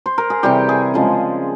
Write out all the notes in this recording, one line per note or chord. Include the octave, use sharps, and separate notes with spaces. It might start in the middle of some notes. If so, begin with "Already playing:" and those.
C5
A#4
G#4
C3 E3 G3 G4
G#4
C#3 F3 G#3